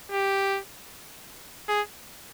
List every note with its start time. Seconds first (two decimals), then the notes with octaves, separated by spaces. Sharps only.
0.12 G4
1.68 G#4